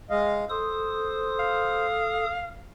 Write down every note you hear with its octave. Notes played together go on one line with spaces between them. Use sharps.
G#3 D#5 F5
A4 C5 D#6
F5